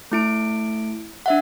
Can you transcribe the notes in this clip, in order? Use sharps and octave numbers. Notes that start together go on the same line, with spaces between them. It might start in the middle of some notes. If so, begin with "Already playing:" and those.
A3 E4 D7
D4 E5 F#5